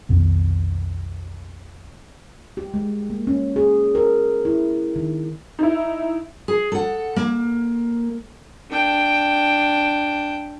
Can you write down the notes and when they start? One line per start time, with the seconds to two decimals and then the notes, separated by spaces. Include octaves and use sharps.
0.09 B1 F2 D#3 B3
2.57 G4
2.74 G#3
3.10 A#3
3.27 C#4
3.56 G#4
3.95 A#4
4.45 E4
4.96 D#3
5.59 D#4 E4
6.48 G#4
6.72 A4 F#5
7.16 A#3
8.70 D4 G5